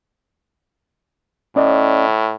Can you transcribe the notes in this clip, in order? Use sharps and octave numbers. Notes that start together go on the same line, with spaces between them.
A2 C#4 D5 D#5